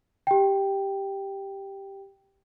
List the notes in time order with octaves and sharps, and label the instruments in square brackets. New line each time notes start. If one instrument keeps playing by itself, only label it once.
[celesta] G4 G5